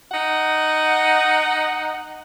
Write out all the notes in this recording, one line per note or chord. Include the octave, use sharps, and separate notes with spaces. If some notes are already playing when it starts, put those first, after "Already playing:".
D#4 F#5